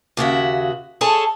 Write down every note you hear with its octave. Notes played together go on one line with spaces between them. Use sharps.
D#2 C#3 F#4 E5
G#4 A4 C#5 G#5 A5